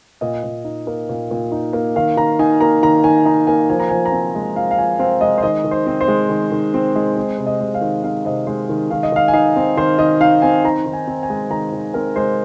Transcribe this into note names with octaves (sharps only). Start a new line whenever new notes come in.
A#2 D#5
A#2
D#4
A#3
A#2
A#2
D#4
A#3
D#3 F5
D#3 A#5
D#4 G#5
A#3 A#5
D#3 A#5
D#3 G#5
D#4 A#5
A#3 G#5
F3 G#5
A#5
F3 G#5
A#5
C4 G#5
G#3
F3 F5
F5
F3 G#5
C4 F5
G#3 D#5
C5
D#3 D#5
D#3
C5
C4
C5
G#3
D#3
D#3
C4
G#3
C4
C3
D#5
G#3
F5
D#3
C4 F5
C3 D#5
G#3 C5
D#3
D#3 F5
D#5
D#3 F5
G#5
D#4 F5
C4
D#3 C5
D#3 D#5
D#4 F5
C4 G#5
D#3 A#5
D#3
G#5
C4
G#5
G#3
D#3 A#5
D#3
C4 A#4
G#3 C5